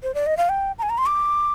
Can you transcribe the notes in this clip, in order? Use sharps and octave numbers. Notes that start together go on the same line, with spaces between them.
C5
D5
D#5
F5
G5
A#5
G#5
A#5
C6
D6